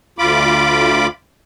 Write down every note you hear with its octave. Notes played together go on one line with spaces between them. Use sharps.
D2 F4 B5 D6